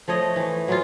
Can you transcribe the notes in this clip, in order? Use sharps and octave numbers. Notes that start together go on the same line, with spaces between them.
F3 A3 C#5 D#5
E3
F#3 G#3 F4